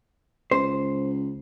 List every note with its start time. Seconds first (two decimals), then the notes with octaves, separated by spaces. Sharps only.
0.51 C#2 C5